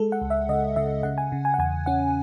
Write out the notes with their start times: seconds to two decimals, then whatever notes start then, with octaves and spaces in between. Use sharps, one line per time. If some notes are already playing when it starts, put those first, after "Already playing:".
Already playing: G#3 A4
0.12 F#5
0.21 C#2
0.30 E5
0.49 C#3 D#5
0.76 C#3 E5
1.03 C#3 F#5
1.18 G#5
1.32 C#3
1.45 G#5
1.54 F#5
1.59 E2 G#5
1.86 C#4 F#5